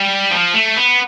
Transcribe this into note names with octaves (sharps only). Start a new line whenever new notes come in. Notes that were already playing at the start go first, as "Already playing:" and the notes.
Already playing: G3
F3
A3
B3